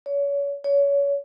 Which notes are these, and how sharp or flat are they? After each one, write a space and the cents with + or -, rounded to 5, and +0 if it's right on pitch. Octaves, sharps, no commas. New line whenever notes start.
C#5 +35
C#5 +30